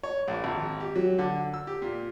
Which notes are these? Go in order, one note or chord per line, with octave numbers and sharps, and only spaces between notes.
C#5
A#1
G#1
G4
F#3
D3
E6
G4
A#2